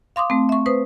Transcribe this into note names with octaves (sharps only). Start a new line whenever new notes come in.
F5 C6 D6 D#6
A3 C4
E5 C#6
B4 C5 D#6